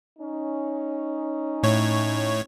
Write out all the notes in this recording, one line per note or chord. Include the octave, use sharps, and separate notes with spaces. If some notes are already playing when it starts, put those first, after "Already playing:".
C#4 D#4
A2 C#5